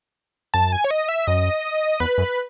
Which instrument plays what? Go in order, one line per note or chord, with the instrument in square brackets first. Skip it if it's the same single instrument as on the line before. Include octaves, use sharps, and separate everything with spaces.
[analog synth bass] F#2 [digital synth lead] A5
[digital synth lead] G#5
C#5
D#5
E5
[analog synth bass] F#2 [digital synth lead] D#5
[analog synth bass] E2 [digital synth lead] B4
[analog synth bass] F#2